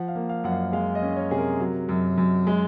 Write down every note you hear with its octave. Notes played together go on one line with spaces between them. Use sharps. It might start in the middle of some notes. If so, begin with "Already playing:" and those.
Already playing: F3 F#5
F5
A#3
F5
F#2 F#5
F5
G#3 F5
D#5
C#4
C#5
C3 G#4
A#4
F#3
F#2
F#2
G#3